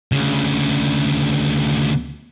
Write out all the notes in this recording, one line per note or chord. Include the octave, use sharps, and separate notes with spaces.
D2 C#3